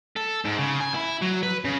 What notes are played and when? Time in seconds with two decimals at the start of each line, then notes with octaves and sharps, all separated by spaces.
0.16 A4
0.45 G#2
0.59 C#3
0.81 G#5
0.95 E4
1.22 F#3
1.43 B4
1.65 C#3